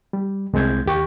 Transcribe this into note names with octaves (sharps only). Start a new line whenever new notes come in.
G3
C2 G#3 C4 G6 G#6
D#2 G4 C#6